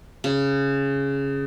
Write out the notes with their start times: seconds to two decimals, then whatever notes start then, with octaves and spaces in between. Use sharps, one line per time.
0.24 C#3